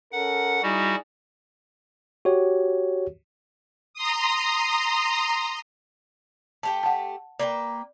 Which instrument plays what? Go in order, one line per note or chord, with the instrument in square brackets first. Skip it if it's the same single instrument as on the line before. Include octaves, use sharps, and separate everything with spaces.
[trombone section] C#4 A4 A#4 [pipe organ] F#5
[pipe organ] G3 F#4 [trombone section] D#4 E4 G#4
[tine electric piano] F#4 G4 C#5
[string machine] A#5 C6 D#6
[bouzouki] A3 G4 G5 [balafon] A5
[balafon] F#5 A5
[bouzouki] A#3 B4 G5 [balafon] D5